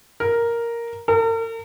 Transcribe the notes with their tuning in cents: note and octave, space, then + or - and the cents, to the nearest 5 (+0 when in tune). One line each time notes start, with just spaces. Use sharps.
A#4 +0
A#4 -45